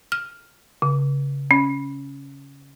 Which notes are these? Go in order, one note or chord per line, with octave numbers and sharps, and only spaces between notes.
F6
C#3
C#4